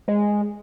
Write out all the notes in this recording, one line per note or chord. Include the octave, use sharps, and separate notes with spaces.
G#3